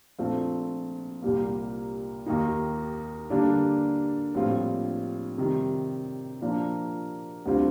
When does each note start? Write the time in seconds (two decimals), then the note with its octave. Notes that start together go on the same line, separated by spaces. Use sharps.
0.19 A#1 A#2 A3 C4 F4
1.22 C2 A#2 G3 A#3
2.26 D#2 D#3 A#3 D#4
3.30 D3 G3 A#3 D4
4.34 A#1 A2 G3 C4 F4
5.38 C3 D#3 G3
6.42 A#2 F3 A#3 D4
7.46 D2 D3 G3 C4 F4